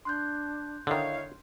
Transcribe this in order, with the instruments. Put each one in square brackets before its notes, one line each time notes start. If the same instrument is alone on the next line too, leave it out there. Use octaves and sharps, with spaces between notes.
[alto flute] D4 [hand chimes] C6 F#6 G6
[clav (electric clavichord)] D3 D#3 [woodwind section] D#4 C#5 F5 [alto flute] E4